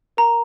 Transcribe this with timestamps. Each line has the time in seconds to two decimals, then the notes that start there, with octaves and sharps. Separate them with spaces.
0.17 A#4 A#5